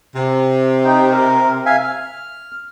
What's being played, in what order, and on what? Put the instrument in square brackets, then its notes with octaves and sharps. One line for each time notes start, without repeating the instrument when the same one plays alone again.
[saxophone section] C3
[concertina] D#4 G5
A#4
E5 F5 G#5
F6